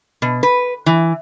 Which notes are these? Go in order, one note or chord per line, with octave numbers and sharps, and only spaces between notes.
B2
B4
E3